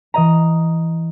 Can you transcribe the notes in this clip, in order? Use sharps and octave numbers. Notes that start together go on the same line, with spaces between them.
E3 D#5 A#5